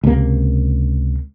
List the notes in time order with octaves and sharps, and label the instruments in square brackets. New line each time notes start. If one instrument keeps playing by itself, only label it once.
[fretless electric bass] C#2 C3 A#3